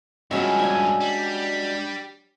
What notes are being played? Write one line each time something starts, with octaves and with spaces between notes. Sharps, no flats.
G2 F3 G#3 C#4 F#4 D#5 E5
D4 E5 G#5
G3